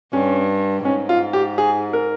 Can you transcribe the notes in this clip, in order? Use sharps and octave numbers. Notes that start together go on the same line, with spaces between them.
G2 C#4
G#2 C#4
F4
G4
G#4
A#4